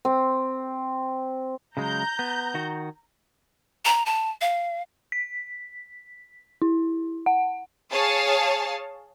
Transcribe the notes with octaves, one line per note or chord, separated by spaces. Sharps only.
C4
C#3 F#3 G#3 A#5 G6
B3
D#3 F#4
A#5
A5
F5
B6
E4
F#5
G#4 C#5 F5 A5